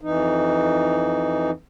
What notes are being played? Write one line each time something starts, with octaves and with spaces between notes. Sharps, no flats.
F2 E3 D#4